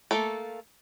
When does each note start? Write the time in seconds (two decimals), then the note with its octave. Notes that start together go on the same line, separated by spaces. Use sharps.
0.11 A3 A#3 A4